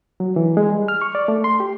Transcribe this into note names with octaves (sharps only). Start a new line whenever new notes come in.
F#3
E3
G#3
G3
F6
C#6
D5
A3
C6
G4